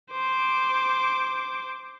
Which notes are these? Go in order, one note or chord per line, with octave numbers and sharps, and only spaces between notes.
C5 D6